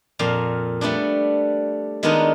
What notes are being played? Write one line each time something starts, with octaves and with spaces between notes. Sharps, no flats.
F2 A#2 F5
G3 A3 B3 D4
D#3 G#3 B3 D4 D#4 F4